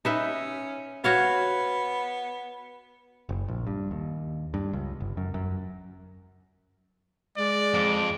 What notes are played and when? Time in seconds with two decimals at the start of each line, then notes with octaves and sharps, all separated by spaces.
0.05 C#4 D#4 B4 E5
1.04 B3 F#4 C#5 F5
3.29 F#1
3.48 A#1
3.67 G2
3.91 D#2
4.54 G2
4.73 C#2
5.00 G1
5.17 F#2
5.34 F#2
7.37 G#3 D5
7.74 F2 D6